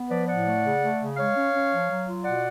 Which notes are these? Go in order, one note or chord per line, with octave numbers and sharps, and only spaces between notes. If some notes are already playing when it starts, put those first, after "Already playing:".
Already playing: B3
F3 B4 D5
A2 D5 F#5
A3
C#3
A3
C#3
G#3 C#5 F5
C#4
C#4
F3
F#3
F4
B2 D5 F#5